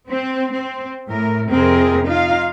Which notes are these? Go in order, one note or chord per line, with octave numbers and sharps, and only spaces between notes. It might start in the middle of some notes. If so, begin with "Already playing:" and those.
C4
C4
A2 A#4
F2 C3 C4 G#4 A#4
D#4 F4 F5